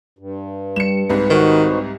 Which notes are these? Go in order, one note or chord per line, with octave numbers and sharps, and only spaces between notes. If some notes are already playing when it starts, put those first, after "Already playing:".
G2
G3 C#7 E7
C2 G#2 B4
D#3 D#4 F#4 C5